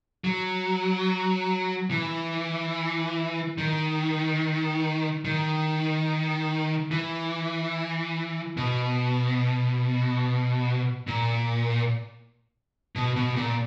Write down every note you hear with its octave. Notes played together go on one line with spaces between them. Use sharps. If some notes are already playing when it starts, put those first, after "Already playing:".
F#3
E3
D#3
D#3
E3
B2
A#2
B2
B2
A#2